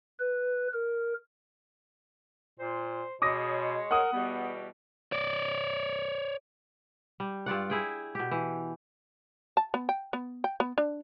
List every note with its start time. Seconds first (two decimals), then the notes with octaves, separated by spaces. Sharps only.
0.19 B4
0.73 A#4
2.60 A#2 C5
3.22 B2 G#3 C#5 D6 D#6 A#6
3.91 A#4 F#5 D#6
4.13 E2 B2 G3 B3
5.12 C#5 D5
7.20 G3
7.46 G2 F4 D5 F#5
7.70 E4 G#4 G5
8.15 B2 G4
8.31 E3
9.57 A5
9.74 B3
9.89 G5
10.13 B3
10.44 G5
10.60 B3
10.78 D4